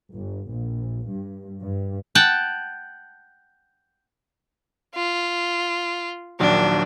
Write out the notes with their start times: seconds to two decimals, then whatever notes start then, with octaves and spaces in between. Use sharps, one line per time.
0.11 G1
0.47 A#1
1.07 G2
1.61 G2
2.15 F#5 G5 A5
4.95 F4
6.40 A#1 D#2 F#3 D4